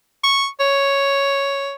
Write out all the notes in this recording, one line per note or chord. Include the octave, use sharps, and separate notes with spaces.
C#6
C#5